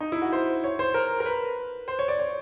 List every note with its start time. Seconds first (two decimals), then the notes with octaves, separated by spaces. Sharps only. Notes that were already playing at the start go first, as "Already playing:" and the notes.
0.01 D#4
0.12 E4
0.22 F#4
0.32 C5
0.64 C#5
0.79 C5
0.94 A#4
1.20 A#4
1.26 B4
1.88 C5
1.99 C#5
2.08 D5
2.19 C#5